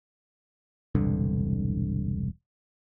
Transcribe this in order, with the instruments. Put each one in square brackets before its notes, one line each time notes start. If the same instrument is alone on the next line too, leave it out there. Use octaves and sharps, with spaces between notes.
[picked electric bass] E1 C2 G2 D3